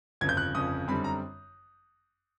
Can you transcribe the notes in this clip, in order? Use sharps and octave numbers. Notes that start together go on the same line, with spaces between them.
G1 F2 C#3 G#6
G6
F#6
G1 F2 C#3 D#6
F#2 D3 G3 C4 B5
A#5